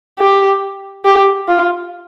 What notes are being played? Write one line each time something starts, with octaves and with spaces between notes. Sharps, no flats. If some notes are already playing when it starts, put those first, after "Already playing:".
G4
G4
F4